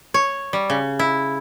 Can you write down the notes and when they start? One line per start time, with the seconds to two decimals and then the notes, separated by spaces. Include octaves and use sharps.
0.14 C#5
0.53 G3
0.70 C#3
0.99 E4